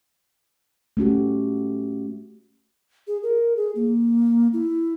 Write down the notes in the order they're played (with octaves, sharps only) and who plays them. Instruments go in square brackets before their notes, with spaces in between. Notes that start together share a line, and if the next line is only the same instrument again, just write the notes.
[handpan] A3 C#4 F#4 G4
[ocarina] G#4
A#4
G#4
A#3
E4